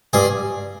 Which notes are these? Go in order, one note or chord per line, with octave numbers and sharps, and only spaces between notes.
G2 G#4